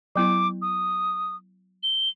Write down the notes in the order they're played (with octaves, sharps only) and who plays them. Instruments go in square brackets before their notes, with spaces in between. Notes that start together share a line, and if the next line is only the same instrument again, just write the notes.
[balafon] F#3 B3 E4 [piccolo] D6
[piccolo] D#6
G7